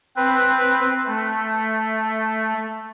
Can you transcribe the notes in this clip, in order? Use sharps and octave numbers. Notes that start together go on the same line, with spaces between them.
C4 B4
A3